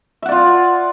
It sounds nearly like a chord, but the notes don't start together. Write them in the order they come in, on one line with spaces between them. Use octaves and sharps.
E5 F#5 D5 F4